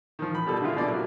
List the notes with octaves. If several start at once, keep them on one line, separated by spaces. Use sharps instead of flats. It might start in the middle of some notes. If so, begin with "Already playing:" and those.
D#3 F3
B5
B2 G3 A4
D3 G#3 E4 F4 G#4
B2 A#3 D5
C3 F#3